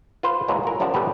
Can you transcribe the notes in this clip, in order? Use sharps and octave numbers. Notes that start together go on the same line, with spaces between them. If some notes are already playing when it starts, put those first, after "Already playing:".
F4 B4 C5
A#2 E3 F#3 G#3 E4
A#4 F#5
F#2 F3 G4 D5 F#5 A5
G3 B3 C#4 G4 A4 B4